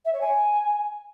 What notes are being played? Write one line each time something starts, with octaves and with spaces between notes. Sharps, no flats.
E5
C#5
G#5